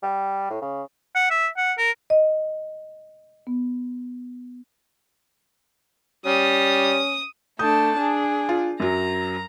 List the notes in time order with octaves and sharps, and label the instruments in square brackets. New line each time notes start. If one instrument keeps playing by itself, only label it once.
[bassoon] G3
A2
C#3
[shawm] F#5
E5
F#5
A#4
[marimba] D#5
B3
[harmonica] G3 [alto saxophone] C#4 [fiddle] D#6
[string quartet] A3 D4 A5 [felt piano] D#6 G6
[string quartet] D4 G#4
[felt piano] F4
[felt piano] F#2 F#3 [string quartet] A#5